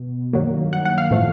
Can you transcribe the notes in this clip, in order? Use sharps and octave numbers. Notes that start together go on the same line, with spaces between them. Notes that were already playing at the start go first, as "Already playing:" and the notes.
Already playing: B2
G2 D#3 F#3 A#3
F#5
F#5
F5
A2 F3 A3